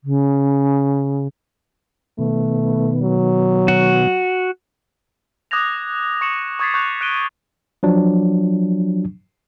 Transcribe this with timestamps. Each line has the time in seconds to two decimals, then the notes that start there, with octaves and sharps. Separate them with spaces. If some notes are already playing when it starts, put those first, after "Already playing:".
0.04 C#3
2.19 B2 D#3 A3 B3
3.01 F#3
3.68 F#4
5.51 D6 D#6 F#6 G#6 A#6 F7
6.21 C#6 C#7 E7 F#7
6.59 C#6 D#6 G#6 A6 B6 C7
6.74 C#6 F#6 G6 F7
7.01 F#6 D7 D#7 G7
7.83 F3 F#3 D4